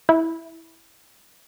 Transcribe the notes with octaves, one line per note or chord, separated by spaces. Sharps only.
E4